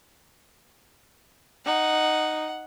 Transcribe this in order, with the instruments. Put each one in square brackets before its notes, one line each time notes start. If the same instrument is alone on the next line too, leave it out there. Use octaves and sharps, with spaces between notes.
[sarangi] D#4 [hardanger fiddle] F#5